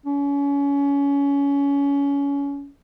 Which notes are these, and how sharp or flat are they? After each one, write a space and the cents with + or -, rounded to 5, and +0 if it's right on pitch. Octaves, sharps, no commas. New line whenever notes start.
C#4 +25